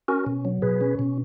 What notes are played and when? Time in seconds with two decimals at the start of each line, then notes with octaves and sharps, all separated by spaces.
0.08 C#4 F#4 A#4
0.26 B2
0.45 F#3
0.62 B2 G#4 B4
0.81 C#4
0.99 B2